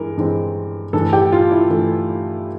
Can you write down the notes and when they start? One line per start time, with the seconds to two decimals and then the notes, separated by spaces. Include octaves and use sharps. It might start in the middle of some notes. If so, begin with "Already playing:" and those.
Already playing: G2 E3 G#3 A#4
0.17 G2 E3 G#3 C4
0.93 G2 E3 A3 A4
1.13 G4
1.32 F4
1.51 E4
1.70 G2 E3 A3